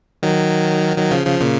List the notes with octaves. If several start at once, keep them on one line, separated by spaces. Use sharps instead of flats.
D#3 F#3
D#3 F#3
C#3 F3
C#3 F3
A#2 C#3